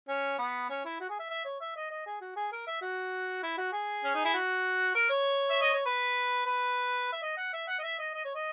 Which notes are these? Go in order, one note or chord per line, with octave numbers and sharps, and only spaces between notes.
C#4
B3
C#4
E4
F#4
G#4
E5
E5
C#5
E5
D#5
D#5
G#4
F#4
G#4
A#4
E5
F#4
E4
F#4
G#4
C#4
D#4
E4
F#4
A#4
C#5
E5
D#5
C#5
B4
B4
E5
D#5
F#5
E5
F#5
D#5
E5
D#5
D#5
C#5
D#5